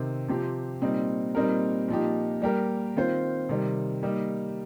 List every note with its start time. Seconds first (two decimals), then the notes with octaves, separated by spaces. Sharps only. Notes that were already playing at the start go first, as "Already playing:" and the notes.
Already playing: C3 D#3 C4
0.28 C3 F3 C4 G4
0.82 A#2 G3 C4 D#4
1.35 A#2 G3 C4 D#4 A#4
1.88 A#2 F3 D#4 G4
2.42 G3 A#3 G4 A#4
2.96 D#3 C4 F4 C5
3.49 C3 D#3 G3
4.03 G3 A#3 D#4 G4